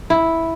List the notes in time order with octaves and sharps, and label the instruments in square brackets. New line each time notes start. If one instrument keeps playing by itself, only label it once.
[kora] E4